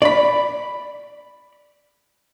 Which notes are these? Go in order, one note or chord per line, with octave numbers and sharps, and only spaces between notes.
D5 B5